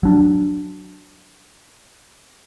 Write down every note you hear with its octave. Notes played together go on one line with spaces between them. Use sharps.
F#3 D4